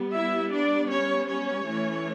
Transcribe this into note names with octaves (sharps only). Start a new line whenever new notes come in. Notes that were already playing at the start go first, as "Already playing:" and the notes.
Already playing: G3 B3
E4 E5
D4 D5
C#4 C#5
C#4 C#5
E3 A3 C#4